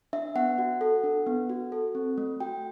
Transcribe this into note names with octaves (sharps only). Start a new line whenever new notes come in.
D4 E5
B3 F#5
F#4
A4
D4
B3
F#4
A4
C4
A3
F#4 G5